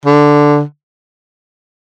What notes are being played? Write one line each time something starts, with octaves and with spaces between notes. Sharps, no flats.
D3